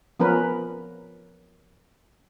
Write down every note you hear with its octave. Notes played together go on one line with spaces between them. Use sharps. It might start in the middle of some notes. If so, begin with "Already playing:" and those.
F3 B3 C#4 A#4 B4